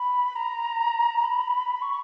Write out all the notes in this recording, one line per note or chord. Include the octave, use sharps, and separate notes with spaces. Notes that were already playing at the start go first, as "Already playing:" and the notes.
Already playing: B5
A#5
B5
C#6